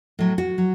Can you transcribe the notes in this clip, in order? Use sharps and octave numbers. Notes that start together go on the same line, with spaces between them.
A2 F#3
F#4
F#3